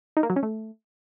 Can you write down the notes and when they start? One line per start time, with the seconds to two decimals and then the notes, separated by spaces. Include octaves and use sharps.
0.17 D#4
0.23 A#3
0.30 F#3
0.36 C#4
0.43 A3